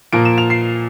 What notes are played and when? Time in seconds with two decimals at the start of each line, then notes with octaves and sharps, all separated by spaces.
0.13 A#2 F3 A#3 D7
0.25 E7
0.38 F7
0.50 C7